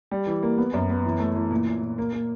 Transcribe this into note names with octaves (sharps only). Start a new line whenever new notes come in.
G3
E3
A#3
B3
F#2
B3
E3
A3
E3
A#2
A#2
A#2
A#3
A#3